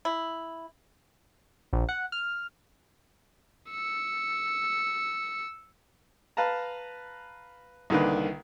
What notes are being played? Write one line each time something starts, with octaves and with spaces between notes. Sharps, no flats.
E4
A#1
F#5
F6
E6 C#7
B4 F5 A5 A#5
C2 D3 D#3 A#3 B4